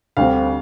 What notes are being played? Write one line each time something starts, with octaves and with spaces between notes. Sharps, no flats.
D2 D3 G3 C4 F5